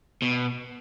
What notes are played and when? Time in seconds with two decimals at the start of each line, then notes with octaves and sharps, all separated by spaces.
0.22 B2